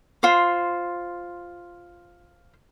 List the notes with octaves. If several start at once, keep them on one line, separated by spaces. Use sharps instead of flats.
F4 C5